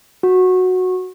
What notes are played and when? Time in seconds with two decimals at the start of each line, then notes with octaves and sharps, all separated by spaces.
0.23 F#4